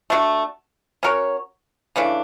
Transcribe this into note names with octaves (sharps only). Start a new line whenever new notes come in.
A3 D4 F#4
C#4 F#4 A#4 C#5
C#3 E3 A3 D4